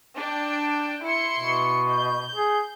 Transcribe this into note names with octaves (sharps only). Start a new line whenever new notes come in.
D4 G5
E4 C6 C#7
B2
G6
G#4